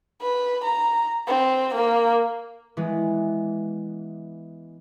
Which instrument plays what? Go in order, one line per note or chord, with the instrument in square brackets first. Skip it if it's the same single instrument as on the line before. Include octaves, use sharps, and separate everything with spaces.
[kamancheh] B4
A#5
C4
A#3
[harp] E3 G#3 B3